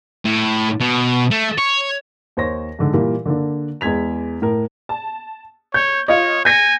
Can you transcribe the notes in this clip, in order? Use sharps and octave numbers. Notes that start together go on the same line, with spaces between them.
A2
B2
A3
C#5
D#2 C5 C#5 A#6
G#2 D3
A#2 E3 G3 A#3
D3 A#3 D4
E2 G#3 G#6 B6 F7
A2 A#4
A5
C#5 G6
F4 C#5 D#5
G#5 G6 A#6 C#7